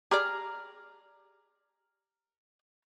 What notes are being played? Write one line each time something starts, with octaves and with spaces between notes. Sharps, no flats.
G4 G#4 D5 A#5 F6